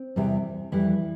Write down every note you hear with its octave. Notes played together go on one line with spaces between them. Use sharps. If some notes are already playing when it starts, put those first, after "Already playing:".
Already playing: C4
E2 C3 E3 G3
F2 E3 G3 E4